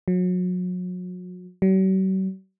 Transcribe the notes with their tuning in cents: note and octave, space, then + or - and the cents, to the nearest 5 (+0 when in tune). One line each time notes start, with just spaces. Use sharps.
F#3 -35
F#3 +45